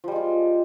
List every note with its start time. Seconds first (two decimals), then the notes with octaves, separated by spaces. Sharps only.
0.04 F3
0.08 G3
0.12 G#3
0.16 F4